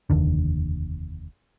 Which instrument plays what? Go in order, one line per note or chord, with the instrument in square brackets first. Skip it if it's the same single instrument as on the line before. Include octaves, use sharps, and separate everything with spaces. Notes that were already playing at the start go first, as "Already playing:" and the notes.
[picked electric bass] F1 D#2 D3